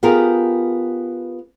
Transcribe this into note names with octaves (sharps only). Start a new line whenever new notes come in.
B3 F4 G4 G#4 A#4